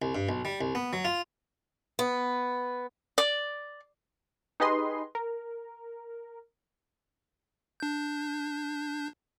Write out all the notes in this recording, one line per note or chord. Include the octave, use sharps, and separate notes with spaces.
C2
G2
B1
G3
C2
B3
F#3
F4
B3
D5
D#4 G4 G#4 B4 D#5 C6
A#4
D4 G6